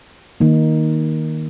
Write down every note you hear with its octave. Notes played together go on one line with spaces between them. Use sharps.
D#3 A#3 D#4